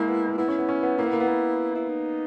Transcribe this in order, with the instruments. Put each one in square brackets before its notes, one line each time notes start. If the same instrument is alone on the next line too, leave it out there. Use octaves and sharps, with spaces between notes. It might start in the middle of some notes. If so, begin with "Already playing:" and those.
Already playing: [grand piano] G#3 A#3 [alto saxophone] E4
[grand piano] B3
A#3
[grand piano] B3 [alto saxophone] E4
[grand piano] C#4
B3
C#4
B3
[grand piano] A#3 [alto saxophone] E4
[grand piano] B3
A#3
B3
A#3
[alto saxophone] E4
D#4